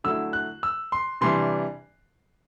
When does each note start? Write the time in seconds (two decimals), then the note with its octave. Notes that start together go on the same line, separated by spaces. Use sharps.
0.04 D3 F#3 A3 E4 E6
0.33 F#6
0.63 E6
0.92 C6
1.21 C3 E3 G3 D4 C6